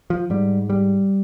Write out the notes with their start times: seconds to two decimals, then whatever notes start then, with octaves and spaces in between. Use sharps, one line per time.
0.10 F3
0.30 G#2 G3
0.70 G3